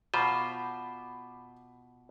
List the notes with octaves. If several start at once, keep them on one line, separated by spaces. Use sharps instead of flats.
B2 F4 C5 B5 D6